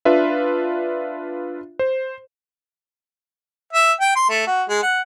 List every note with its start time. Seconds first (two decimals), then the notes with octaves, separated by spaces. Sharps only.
0.05 D4 F4 B4 E5
1.79 C5
3.73 E5
4.00 G5
4.16 C6
4.29 A3
4.47 F#4
4.69 G#3
4.82 F#5